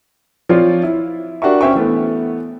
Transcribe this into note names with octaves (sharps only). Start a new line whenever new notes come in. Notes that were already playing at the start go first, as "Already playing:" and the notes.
F3 C4 F4 C#5 D5
E4
D4 F#4 G4 A#4 E5 C#6
C#4 C5 E5 G5 C#6
E3 A3 B3